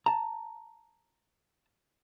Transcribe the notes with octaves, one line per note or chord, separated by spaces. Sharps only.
A5 A#5